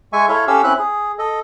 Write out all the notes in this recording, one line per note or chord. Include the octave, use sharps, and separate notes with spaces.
G#3 E5 G#5 C#6
E4 A4 C#5 E5 F5 C6
C#4 G4 A4 F5 E6
C4 C#4 E4 B5 F#6
G#4
A4 D#5